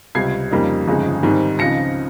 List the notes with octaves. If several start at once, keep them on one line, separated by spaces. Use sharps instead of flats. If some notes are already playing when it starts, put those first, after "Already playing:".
C#2 C3 G3 G#6 C7
F2 C#3 G3 A#3 D#4
G1 F2 C#3 G#3 D#4
G#2 D#3 G3 C4 D#4
C#2 C#3 F3 C4 D#4 A#6 C#7